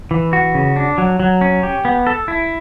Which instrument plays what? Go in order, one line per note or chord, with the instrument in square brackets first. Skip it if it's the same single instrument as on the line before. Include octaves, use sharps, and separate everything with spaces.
[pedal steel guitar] E3
F#4
C#3
D4
F#3
F#3
C#4
G4
B3
A4
E4